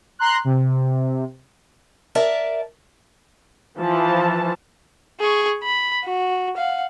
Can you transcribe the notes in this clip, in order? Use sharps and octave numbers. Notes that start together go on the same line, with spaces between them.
A#5 C6 F#6
C3
A#4 D5 E5 A5
E3 F3 A5
G#4 C#6
B5
F#4
F5 F#5